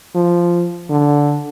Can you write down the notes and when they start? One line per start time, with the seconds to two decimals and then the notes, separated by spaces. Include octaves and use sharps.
0.15 F3
0.90 D3